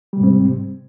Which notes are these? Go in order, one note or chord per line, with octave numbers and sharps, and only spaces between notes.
G#2 C3 G3 C4